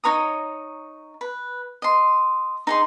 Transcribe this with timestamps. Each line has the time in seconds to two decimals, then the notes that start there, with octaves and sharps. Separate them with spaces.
0.04 D#4 C#5 A#5 D#6
1.21 B4
1.82 D#5 C6
2.67 D#4 G#4 C6